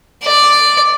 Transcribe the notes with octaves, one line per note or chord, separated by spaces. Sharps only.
D5